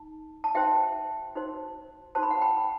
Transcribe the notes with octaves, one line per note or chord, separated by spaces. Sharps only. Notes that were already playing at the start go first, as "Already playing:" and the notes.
Already playing: D#4
A5
D#4 F#4 C5 E5 G5
D#4 F#4 C5
D#4 F#4 C5 A5
B5
F#5 A5
G5 B5
B5